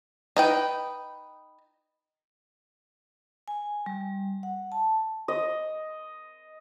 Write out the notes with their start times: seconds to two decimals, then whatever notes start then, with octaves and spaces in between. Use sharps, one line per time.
0.37 D#4 B4 G5
3.48 G#5
3.86 G3
4.43 F#5
4.72 A5
5.28 D#5